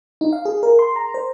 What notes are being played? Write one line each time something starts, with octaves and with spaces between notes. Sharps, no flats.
D#4
F5
G#4
A#4
C6
A#5
C5